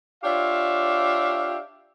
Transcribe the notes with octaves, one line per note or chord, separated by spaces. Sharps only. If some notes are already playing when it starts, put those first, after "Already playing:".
D4 F4 G4 C#5 E5 F5